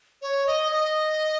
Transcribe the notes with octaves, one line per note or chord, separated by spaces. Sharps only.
C#5
D#5
D#5